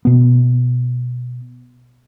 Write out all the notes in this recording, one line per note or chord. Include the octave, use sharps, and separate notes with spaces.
B2 B3